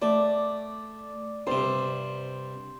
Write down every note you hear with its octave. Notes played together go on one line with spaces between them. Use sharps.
A3 D5
G2 C3 C5